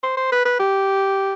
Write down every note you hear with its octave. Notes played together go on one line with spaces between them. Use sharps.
C5
C5
B4
B4
G4